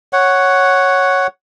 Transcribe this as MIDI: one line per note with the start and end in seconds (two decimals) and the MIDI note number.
0.13 1.27 73
0.13 1.27 78